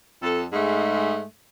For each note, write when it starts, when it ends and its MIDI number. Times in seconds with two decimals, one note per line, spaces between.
0.23 0.44 41
0.23 0.44 69
0.53 1.24 44
0.53 1.24 56
0.53 1.24 57